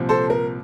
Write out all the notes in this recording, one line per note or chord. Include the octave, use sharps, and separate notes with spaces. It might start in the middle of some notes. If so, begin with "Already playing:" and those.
Already playing: C2 A#2 F3 C4
A4 C5
A#4